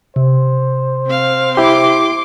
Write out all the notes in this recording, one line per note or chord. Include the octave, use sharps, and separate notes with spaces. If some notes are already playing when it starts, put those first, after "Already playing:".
C3 C5
C4 F5
E4 G4 C6 D6